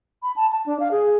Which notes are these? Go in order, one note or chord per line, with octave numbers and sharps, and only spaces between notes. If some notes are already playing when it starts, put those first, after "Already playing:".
B5
A5
A5
D4
F5
G#4